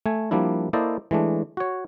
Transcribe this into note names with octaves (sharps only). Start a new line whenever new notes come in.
A3 G#5
F3 G3 A#3 D4 E4
A#3 E4 A4 C5 D5 D#5
E3 G#3 A3 D4
F#4 C#5